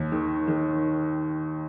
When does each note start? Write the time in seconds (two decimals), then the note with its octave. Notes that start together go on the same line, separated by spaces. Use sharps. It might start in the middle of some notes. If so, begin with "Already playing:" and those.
Already playing: D#2
0.12 D#3
0.48 D#3